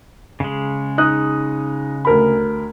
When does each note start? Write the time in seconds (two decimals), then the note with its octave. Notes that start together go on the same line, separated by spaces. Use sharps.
0.40 C#3 G#3
0.98 D#4 D#6 F#6
2.05 D2 A#4 B5